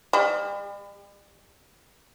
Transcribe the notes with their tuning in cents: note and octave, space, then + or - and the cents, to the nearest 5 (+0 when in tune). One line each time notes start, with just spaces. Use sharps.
G3 +45